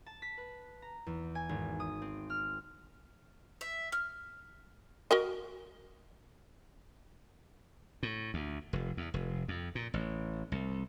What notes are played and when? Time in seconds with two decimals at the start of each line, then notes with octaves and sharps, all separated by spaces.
0.06 A5
0.22 B6
0.37 B4
0.82 A#5
1.06 E2
1.35 G#5
1.49 G#1
1.80 D#6
2.02 C4
2.30 F6
3.61 E5
3.92 F6
5.11 F#4 A#4 D#5
8.03 A2
8.34 D2
8.73 F1
8.97 E2
9.14 F1
9.48 F2
9.75 A#2
9.94 A1
10.52 C2